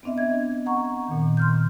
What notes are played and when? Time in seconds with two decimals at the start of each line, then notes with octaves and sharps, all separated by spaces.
0.03 B3 C4 D4 D#5 E5
0.18 G#6
0.66 F#5 A#5 C#6
1.08 A#2 D#3
1.37 C6 F6 G6